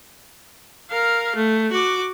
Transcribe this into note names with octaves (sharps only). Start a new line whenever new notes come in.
A#4 F5
A3
F#4 D6